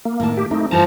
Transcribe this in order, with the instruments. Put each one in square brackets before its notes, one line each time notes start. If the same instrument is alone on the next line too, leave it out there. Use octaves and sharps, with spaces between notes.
[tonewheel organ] A#3
[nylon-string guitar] A2 D#3 A5
[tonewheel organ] G4
[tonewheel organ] A3 D#4 [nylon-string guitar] C4
[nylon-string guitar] G2 E3 C5 [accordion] F3 [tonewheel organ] A5 A#5